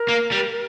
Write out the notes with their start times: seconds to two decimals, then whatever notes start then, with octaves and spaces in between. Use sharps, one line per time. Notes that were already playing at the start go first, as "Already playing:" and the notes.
Already playing: A#4
0.09 A#3
0.32 G3